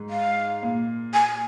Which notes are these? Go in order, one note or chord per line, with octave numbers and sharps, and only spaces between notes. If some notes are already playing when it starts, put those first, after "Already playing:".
Already playing: G#2
F5
A#2
G#5